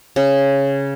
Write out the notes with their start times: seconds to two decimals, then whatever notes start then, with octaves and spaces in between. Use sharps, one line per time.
0.16 C#3